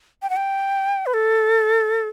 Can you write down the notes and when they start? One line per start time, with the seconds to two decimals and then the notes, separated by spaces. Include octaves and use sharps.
0.22 G5
0.30 F#5
0.36 G5
1.06 B4
1.14 A4